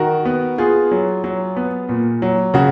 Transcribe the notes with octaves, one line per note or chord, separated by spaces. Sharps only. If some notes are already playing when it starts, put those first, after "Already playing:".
Already playing: D#3 F#4 A#4
B3
B3 F4 G#4
F#3
F#3
B3
A#2
F#3
C#3 F#4